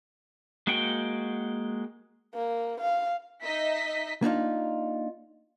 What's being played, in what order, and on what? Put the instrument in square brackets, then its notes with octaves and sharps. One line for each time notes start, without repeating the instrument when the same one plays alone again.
[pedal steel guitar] G#3 A#3 F#4 F#5 G5
[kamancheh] A#3
F5
[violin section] D#4 D#5 E5 B6
[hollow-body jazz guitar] A#3 D4 D#4 F4